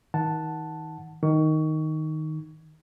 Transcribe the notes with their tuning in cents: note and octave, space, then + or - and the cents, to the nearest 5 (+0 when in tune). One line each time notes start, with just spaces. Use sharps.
D#3 +30 F#5 +0 A5 +0
D#3 +0 C#6 +20